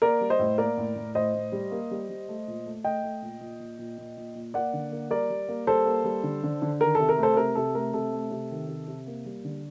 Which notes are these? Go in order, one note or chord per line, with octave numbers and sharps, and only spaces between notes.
A#3 A#4 D5
G3
C5 D#5
A2
A#3 A#4 D5
A2
A2
A2 C5 D#5
A2
G3
A#3
G3
G3
A3
A#2
A3
A3 D#5 G5
A3
A#2
A#2
A#2
A#2
A#2
A#2
A#2
A#3 D5 F#5
D3
A#3
G3 A#4 D5
G3
A#3
G3 A4 C5
A#3
G3
D3
D3
D3
D#3 A#4
C3 A4
A#4
A3
A4 C5
C3 A#4
C3 A4
A3 A#4
C3 A4
A3
C3
D#3
C3
C3
A#3
G3
D3